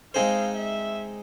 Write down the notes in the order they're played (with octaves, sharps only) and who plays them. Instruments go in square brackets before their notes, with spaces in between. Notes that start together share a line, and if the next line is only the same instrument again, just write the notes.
[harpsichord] G#3 C4 D#4 G#4 C5 [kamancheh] F5
[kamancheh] E5